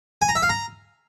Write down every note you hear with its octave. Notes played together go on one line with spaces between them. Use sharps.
G#5
A#5
E5
F5
A#5